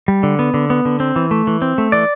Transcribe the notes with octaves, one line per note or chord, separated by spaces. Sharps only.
G3
D3
B3
D3
B3
D3
C4
E3
A3
E3
C4
A3
E3 D5